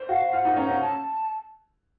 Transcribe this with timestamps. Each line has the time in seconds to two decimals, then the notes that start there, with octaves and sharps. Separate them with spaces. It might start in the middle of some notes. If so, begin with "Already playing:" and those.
Already playing: C5
0.09 F#4 F5
0.33 F4 F#5
0.45 D#4
0.56 C#4 A#5
0.69 C#4
0.81 A5